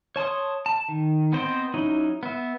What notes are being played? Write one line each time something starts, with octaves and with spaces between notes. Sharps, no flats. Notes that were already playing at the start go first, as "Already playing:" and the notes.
C#5 A5 C6 D#6
A5
D#3
B3 C4 C5 D#5 G5
F#3 C#4 D#4 E4
B3 E5